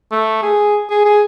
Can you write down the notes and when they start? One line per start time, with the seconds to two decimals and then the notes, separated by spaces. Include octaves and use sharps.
0.11 A3
0.42 G#4
0.90 G#4
1.05 G#4